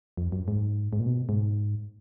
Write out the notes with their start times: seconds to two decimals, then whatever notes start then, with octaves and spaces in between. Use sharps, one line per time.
0.17 F2
0.32 F#2
0.48 G#2
0.93 G#2
1.00 A#2
1.06 B2
1.29 G#2